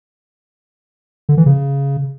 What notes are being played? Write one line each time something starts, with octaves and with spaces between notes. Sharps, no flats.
D3
E3
C#3